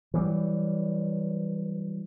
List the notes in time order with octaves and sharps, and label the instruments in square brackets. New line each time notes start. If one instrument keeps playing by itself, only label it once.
[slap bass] E3 F#3 G3